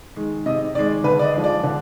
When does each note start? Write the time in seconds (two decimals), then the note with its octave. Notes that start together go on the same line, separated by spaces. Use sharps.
0.16 D#3 G#3
0.46 C3 D#5
0.75 D#3 G#3 D5
1.04 D3 B4
1.19 D5
1.24 D#5
1.33 F3 G#3
1.44 D5
1.63 D3